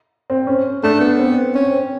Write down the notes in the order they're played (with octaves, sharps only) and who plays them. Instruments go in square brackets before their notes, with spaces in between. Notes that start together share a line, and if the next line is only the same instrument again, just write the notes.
[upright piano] C4
C#4
[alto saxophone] A3 [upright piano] D4
[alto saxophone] B3
[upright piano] C4
[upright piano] C4 [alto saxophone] C#4
[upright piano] C4